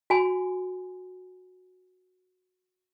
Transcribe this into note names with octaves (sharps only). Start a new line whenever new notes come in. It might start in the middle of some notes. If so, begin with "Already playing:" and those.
F#4 G#5 C6